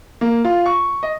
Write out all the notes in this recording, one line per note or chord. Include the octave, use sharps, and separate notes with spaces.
A#3
F4
C#6
D#5